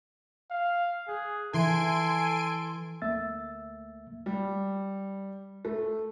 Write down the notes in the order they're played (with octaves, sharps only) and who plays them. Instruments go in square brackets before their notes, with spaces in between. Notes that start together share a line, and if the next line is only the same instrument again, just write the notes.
[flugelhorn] F5
[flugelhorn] G#4 [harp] F#6
[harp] E3 E4 [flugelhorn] A4 [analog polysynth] G#5 C6 D7
[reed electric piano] D2 A3 A#3 E5 E6 A6
[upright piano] G3
A3